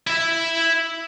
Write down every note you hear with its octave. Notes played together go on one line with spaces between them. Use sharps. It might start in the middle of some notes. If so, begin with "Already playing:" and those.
E4 E5